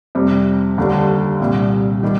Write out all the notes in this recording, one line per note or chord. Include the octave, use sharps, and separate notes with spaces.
F2 C3 G3
D#2 D3 G3 D4
C2 A#2 G3
D#3 G3